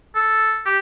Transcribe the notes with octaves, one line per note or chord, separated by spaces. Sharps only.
A4
G4